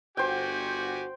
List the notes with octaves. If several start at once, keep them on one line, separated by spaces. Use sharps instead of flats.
G1 F#4 G4 C5 G5 G#5